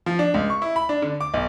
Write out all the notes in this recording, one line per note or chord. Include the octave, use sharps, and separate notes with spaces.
F3
D4
C#2
C#6
E4
B5
D4
D3
D6
B1